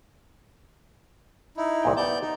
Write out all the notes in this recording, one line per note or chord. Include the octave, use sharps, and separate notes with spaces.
D#4 E4
C2 A#2 G5
B3 D5 A5 A#5 G6
D#4